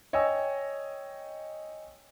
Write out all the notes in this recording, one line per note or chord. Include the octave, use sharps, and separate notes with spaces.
C#5 D#5 G5 G#5 E6